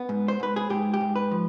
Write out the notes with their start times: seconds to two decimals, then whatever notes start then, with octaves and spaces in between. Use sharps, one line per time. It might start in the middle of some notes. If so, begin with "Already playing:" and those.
Already playing: B3
0.09 G#2
0.28 C5
0.40 G#2 B4
0.56 G#4
0.70 G#2 G4
0.94 G4
1.01 G#2
1.16 B4
1.31 F3